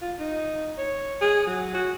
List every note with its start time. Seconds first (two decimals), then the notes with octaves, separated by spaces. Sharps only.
0.02 F4
0.19 D#4
0.77 C#5
1.21 G#4
1.47 F#3
1.74 F#4